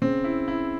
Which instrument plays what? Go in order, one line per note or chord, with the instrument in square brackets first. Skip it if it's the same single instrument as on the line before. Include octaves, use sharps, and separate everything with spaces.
[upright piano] C#3 [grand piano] C4
[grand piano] E4
E4